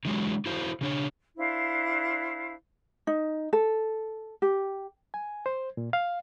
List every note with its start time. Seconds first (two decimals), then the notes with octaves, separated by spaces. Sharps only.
0.05 D3 E3 F#3 G#3
0.46 E4 F#4 A4 C5 F5
0.81 C#3 D4 C#5
1.37 D4 E4 C5 F5
3.07 D#4
3.53 A4
4.42 G4
5.14 G#5
5.46 C5
5.77 A#2
5.93 F5